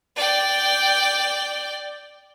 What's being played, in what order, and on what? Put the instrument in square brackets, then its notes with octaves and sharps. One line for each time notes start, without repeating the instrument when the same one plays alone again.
[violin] D5 G5